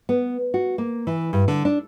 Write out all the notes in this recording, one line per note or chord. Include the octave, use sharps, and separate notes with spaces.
B3
F#4
A#3
E3
G2
D3
D4